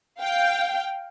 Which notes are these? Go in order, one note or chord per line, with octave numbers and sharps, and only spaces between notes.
F5 G5